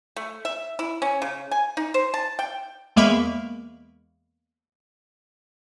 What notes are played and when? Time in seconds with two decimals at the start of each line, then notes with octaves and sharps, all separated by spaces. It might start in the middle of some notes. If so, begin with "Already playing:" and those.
0.16 A3
0.45 E5
0.79 E4
1.02 C#4
1.22 C#3
1.51 G#5
1.77 D#4
1.94 C5
2.14 A5
2.39 G5
2.96 E2 G#3 A#3 E5 B5 C#6